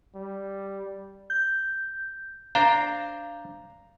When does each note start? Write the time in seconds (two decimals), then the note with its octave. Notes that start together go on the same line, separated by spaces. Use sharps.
0.15 G3
1.30 G6
2.55 D4 C5 F5 A#5